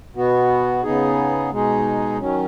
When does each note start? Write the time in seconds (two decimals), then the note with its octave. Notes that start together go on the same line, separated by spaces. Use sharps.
0.15 B2 B3 F#4
0.83 C#3 B3 D#4 G#4
1.50 B2 G#3 D#4 G#4
2.18 D#3 F#3 C#4